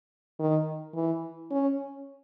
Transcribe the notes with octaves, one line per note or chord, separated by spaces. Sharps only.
D#3
E3
C#4